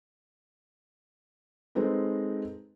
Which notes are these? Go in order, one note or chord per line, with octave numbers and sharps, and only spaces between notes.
G#3 C4 D#4 A4 B4